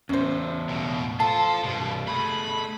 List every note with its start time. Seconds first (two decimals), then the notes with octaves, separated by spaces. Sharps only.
0.09 E2 A2 C#4 C5
0.68 C#2 B2
1.20 F4 A4 C5 A5
1.64 C2 G2 B2
2.07 A3 G#4 B5